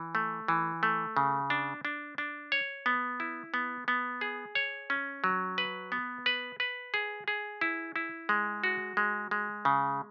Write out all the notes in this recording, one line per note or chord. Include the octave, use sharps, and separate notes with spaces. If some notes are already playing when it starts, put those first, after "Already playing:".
Already playing: E3
A3
E3
A3
C#3
D4
D4
D4
C#5
B3
E4
B3
B3
G#4
C#5
C#4
F#3
B4
B3
B4
B4
G#4
G#4
E4
E4
G#3
F#4
G#3
G#3
C#3